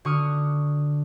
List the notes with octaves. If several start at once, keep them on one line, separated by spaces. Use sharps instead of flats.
D3 F#4 C#6 D#6 F6 C#7